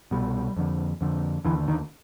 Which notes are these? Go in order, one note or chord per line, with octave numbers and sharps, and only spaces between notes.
C2 B2 G3
F2 D3
F2 D3
D#2 D3 E3
D#3